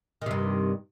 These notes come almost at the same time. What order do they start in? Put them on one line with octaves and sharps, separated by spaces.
D#3 C3 G2